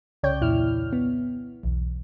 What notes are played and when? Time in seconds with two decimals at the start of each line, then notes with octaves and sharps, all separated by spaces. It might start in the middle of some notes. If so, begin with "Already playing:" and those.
0.23 C2 C#3 C#5 D5 G5 G6
0.41 E2 A#2 E4 F6
0.93 B3
1.63 B1 E2